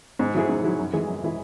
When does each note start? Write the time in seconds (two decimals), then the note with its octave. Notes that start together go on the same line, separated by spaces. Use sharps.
0.19 G#2
0.34 F#3 E4 G#4
0.49 G#2
0.63 F#3 E4 G#4
0.79 F#2
0.93 E3 G#3 E4 G#4
1.08 F#2
1.23 E3 G#3 E4 G#4